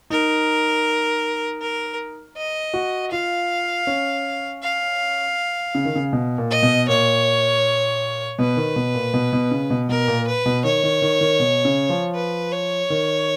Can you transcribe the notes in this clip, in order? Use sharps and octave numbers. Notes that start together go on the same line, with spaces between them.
D#4 A#4
A#4
D#5
F#4
F4 F5
C#4
F5
C#3
D#3
C#3
B2
A#2
D#5
B2
A#2 C#5
B2 B4
D#3
B2
A#2
B2
B2
C#3
B2
B2 A#4
A#2
B4
B2
D#3 C#5
D#3
D#3
D#3
B2
C#3
F3
B4
C#5
D#3